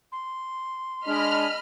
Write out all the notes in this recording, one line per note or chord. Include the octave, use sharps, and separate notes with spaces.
C6
G#3 D4 D#5 B5 F6